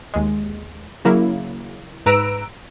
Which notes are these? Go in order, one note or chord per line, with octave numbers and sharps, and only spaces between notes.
D#2 G#3
C#3 F#3 A#3 E4
G#2 B4 A#5 E6 D7